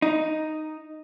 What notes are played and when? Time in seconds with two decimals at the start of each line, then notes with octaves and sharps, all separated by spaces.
0.02 D#4